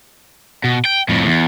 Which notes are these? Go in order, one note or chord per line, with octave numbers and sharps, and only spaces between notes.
B2
G5
F2 A2
E2